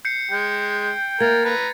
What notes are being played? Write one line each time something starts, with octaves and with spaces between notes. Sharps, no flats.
G6 C7 C#7
G#3 G5
A#3 A#4 G#6 A6
B4 A#5